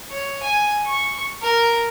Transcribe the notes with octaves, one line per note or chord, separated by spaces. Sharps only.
C#5
G#5
C#6
A#4